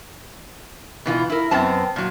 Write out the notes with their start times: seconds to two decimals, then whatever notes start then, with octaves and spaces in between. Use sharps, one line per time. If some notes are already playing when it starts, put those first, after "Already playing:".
1.06 B2 E3 F4
1.30 E4 A#4
1.51 F#2 B3 C4 A5
1.96 A#2 F#3